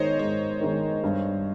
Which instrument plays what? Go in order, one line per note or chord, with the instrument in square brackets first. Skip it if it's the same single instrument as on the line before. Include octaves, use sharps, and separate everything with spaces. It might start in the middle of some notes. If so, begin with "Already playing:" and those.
Already playing: [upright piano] G#2 D#3 G#3 D#4 [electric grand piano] C5 C#5 D#5
[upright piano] G#2 [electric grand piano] C#5
[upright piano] D#3 G#3 D#4
G2